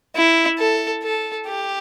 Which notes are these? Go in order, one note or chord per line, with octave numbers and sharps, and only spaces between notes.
E4
A4
A4
G4